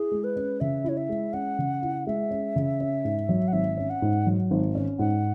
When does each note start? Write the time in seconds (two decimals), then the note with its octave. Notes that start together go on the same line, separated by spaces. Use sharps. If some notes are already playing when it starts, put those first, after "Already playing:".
Already playing: E4 G#4
0.12 G#3
0.24 B4
0.36 C#4
0.60 C#3 E5
0.84 E4 C#5
0.97 E5
1.09 G#3
1.33 C#4 F#5
1.58 C#3
1.82 E4
2.07 G#3 E5
2.31 C#4
2.56 C#3
2.80 C#4
3.05 G#2
3.29 F#3
3.48 F#5
3.53 G#1 E5
3.77 C#4
3.90 F#5
4.02 G#2
4.26 F#3
4.51 G#1
4.75 C#4
4.99 G#2 F#5